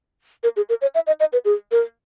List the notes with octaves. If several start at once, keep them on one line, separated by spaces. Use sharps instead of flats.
A#4
G#4
A#4
C#5
E5
D#5
D#5
B4
G#4
A#4